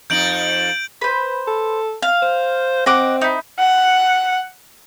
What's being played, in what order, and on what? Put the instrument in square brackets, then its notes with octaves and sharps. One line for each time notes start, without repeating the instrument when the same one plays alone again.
[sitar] F2 D#4 [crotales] G6 D7 F#7
[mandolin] B4 C5
[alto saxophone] A4
[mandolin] F5
[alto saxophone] C5
[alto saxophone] C4 [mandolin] D#5 F#5 D6
[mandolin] D#4 E4
[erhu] F#5